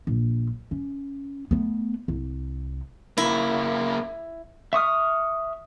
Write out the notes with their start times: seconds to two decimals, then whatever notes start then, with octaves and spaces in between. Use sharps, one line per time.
0.07 A#1
0.71 C#4
1.51 A3 B3
2.08 C2
3.18 C#3 A#3 E4
4.73 E5 C#6 D#6 F6